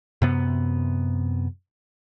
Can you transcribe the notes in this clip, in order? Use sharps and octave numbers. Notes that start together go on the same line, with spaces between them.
F#2 C3 B3